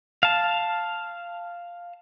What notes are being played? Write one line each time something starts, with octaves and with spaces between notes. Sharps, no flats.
F5 A5